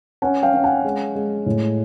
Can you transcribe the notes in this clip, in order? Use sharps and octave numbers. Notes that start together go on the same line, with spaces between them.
C#4 F#5 G#5
F5 G5
C#4
F#5 G#5
G#3
G#3
A2